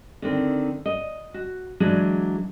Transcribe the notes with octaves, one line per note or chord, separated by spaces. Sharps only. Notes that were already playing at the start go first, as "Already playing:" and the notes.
D3 D#3 C4
D#5
F#4
E3 F#3 G#3 D4 G#4